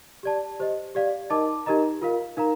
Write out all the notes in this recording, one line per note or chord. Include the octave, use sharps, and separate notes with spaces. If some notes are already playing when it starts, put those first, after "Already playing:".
G4 D5 A5
G4 C5 D#5
G4 D5 F5
D#4 A#4 D#5 A5 D6
D#4 G4 A#4 D#5 A#5
F4 A#4 F5
D#4 A#4 F5 A#5